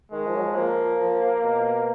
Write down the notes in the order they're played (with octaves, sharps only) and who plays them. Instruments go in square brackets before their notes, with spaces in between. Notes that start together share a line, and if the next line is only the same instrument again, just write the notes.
[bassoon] D#3 [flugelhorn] G#3
[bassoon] F3
F#3
F3
[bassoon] F3 [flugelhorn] A#3
[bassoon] F3
B2